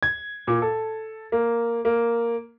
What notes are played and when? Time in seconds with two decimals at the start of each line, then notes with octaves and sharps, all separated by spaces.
0.03 G#6
0.47 A#2
0.62 A4
1.32 A#3
1.85 A#3